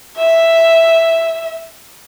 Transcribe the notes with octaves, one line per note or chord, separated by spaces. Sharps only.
E5